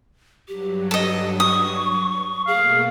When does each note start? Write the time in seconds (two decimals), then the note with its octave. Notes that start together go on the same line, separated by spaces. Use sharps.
0.48 G2 F#3 G4
0.91 A4 D#5
1.40 C#6 D#6
2.47 B2 A3 A#3 G#4 F5